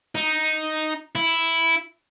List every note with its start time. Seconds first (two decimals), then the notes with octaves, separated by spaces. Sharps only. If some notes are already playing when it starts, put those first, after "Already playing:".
0.15 D#4
1.15 E4